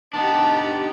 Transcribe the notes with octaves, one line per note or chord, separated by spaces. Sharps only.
B3 D4 D#4 G4 A5